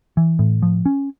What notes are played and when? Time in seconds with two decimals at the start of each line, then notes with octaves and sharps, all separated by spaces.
0.17 E3
0.39 A2
0.62 F3
0.86 C#4